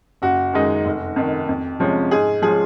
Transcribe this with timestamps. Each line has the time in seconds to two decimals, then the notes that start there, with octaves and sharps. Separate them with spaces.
0.22 F#1 F#4
0.53 F#2 D#3 G#3 D#4
0.85 F1
1.16 F2 D#3
1.49 F2
1.80 C3 F3 G#3 C#4
2.11 G#2 G#4
2.42 F3 G#3 C#4 G#4